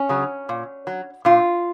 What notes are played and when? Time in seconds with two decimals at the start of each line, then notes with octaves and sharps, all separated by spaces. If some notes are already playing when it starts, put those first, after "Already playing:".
Already playing: C#4
0.09 C#3 F#3
0.49 A#2
0.87 F#3
1.25 A#2 F4